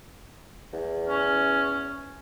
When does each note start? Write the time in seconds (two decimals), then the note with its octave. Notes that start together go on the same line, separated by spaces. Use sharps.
0.73 E2
1.09 C#4